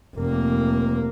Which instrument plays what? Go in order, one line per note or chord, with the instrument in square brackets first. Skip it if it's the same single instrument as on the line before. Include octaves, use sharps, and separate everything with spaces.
[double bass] F1 A#3